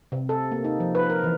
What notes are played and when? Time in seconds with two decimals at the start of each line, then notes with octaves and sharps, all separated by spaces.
0.12 C3
0.29 A4
0.52 A#3
0.64 D#4
0.80 F3
0.95 B4
1.10 A#4
1.24 E3